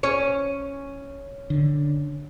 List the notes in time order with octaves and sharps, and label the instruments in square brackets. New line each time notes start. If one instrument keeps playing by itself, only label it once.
[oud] C#4 C#5
[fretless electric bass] D3